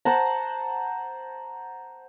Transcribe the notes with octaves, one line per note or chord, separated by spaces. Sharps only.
C5 F#5 A5 A#5